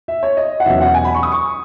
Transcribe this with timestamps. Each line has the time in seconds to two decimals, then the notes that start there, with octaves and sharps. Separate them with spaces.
0.08 E5
0.23 C#5
0.37 D#5
0.60 F#5
0.65 E2 B2 F#3 C#4 E5
0.81 F#5
0.94 G#5
1.04 B5
1.14 C#6
1.23 D#6
1.32 C#6